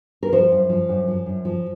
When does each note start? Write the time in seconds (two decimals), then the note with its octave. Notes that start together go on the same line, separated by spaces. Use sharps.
0.23 A#4
0.33 F3 C5
0.52 F#2
0.69 F3
0.89 F#2
1.08 F3
1.26 F#2
1.45 F3